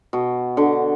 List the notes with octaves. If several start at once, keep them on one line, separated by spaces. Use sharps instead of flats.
B2
D3